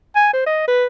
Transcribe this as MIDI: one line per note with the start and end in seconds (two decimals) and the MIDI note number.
0.16 0.29 80
0.33 0.43 72
0.46 0.67 75
0.68 0.86 71